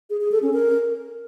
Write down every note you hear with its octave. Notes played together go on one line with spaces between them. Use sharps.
G#4
G#4
A4
C#4
A#4